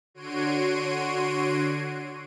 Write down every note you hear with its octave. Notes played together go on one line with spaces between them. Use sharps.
D3 F#4 C#5 C6 D7 D#7